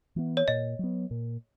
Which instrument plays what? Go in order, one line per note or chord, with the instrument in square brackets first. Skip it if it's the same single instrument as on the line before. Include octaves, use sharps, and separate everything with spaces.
[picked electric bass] E3 B3
[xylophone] C#5
[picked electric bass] A#2 [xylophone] D#5
[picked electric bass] F#3 B3
A#2